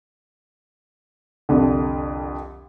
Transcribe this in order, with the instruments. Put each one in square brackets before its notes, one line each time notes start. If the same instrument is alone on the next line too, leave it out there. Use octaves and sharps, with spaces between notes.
[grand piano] C2 F2 D3